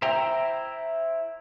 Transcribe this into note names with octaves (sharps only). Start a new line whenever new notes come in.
E4 C5 E5 G5 A#5